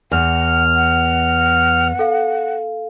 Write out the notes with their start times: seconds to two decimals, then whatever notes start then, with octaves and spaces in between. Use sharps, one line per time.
0.12 E2 F#5 F6
0.76 F#5
1.99 A4 F5